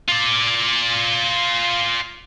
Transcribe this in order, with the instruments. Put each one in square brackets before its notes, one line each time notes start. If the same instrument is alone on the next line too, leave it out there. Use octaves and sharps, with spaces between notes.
[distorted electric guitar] F4 D5